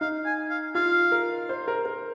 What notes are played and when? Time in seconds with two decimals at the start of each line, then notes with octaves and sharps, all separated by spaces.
0.01 D#4 F5
0.25 G#5
0.50 F5
0.75 F4 F5
1.12 A#4
1.49 C5
1.68 A#4
1.86 A#4